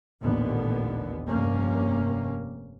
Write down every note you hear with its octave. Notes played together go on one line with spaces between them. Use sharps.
A1 D#2 A#2 D3 B3
F1 G2 C3 A#3 C#4